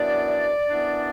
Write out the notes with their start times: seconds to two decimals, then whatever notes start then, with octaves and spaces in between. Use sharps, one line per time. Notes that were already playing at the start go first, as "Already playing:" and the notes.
Already playing: F#2 E3 B3 D4 D5
0.70 F#2 E3 B3 D4